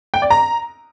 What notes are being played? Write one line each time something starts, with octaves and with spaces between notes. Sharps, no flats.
G5
D5
A#5